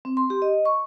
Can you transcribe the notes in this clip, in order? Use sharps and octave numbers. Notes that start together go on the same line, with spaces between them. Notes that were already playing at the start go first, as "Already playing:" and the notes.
C4
C6
G4
D#5
C#6